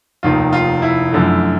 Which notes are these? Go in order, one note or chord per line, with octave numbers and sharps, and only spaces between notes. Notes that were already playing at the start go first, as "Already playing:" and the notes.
F1 D#2 D#3 F4
F4
E4
F#2 D3 F3 A3